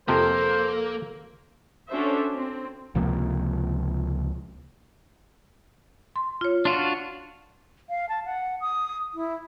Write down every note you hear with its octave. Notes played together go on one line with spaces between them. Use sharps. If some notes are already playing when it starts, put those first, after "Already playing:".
F2 C3 F3 A#3 A4 C5
C#4 D4 F#4 A4 C5 E5
C4
C#2 C3 F3 A#3
C6
F4 C#5
D4 F4 F#4 C6
F5
A5
F#5
D#6
E4